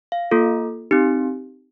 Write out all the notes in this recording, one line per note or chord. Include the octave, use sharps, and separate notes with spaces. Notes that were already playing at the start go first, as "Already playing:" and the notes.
F5
A#3 F4 A4
C4 D#4 G4